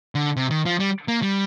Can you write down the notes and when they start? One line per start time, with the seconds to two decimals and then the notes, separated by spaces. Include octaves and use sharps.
0.15 D3
0.37 C3
0.51 D#3
0.65 F3
0.80 G3
1.08 A#3
1.22 G3